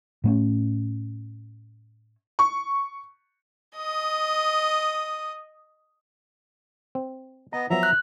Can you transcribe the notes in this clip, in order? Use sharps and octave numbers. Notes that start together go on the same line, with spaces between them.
A2 A3 C#4
C#6
D#5 D#6
C4
B3 D#5 A#5
F3 F#3 B3 E5 A#5
F#6